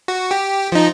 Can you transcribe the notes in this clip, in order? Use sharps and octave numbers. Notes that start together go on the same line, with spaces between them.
F#4
G4
F3 D#4